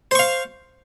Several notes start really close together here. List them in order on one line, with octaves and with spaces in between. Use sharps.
C5 C#6 F5